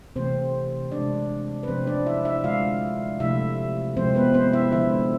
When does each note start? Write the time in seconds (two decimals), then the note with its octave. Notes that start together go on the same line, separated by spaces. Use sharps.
0.16 C3 E3 A3 C4 C5
0.92 C3 G#3 D4 D5
1.63 B4
1.68 C3 F3 A3 C4 C5
1.87 D4 D5
2.06 E4 E5
2.25 E4 E5
2.44 D3 G#3 F4 F5
3.20 C3 F3 A3 E4 E5
3.97 C3 F3 G#3 C4 C5
4.15 B3 B4
4.34 C4 C5
4.53 E4 E5
4.72 D3 F3 G#3 E4 E5